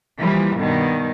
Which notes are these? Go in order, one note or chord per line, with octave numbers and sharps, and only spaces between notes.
E3 F3 G3 A#3
G2 B2 D#3